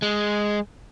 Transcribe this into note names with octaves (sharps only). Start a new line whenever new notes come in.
G#3